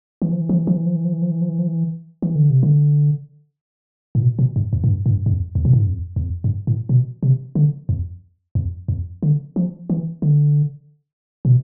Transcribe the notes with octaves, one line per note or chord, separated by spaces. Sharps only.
E3
F3
E3
F3
E3
F3
E3
F3
E3
F3
E3
F3
E3
F3
E3
F3
E3
E3
D3
C3
D3
A2
B2
B2
G2
F2
A2
G2
A2
G2
G2
F2
E2
B2
A2
G2
F2
E2
F2
G2
A2
B2
C3
D3
F2
F2
F2
D3
F3
E3
D3
B2